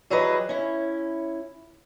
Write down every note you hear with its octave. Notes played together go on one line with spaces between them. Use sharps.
E3 F#3 G3 G#4 B4 D#5
C#4 E4